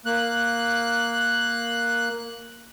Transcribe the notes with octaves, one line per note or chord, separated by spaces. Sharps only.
A#3 F#6